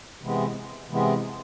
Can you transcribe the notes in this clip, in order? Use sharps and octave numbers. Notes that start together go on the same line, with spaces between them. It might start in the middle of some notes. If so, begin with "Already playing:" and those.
C3 E3 G#3 B3
C3 E3 G#3 B3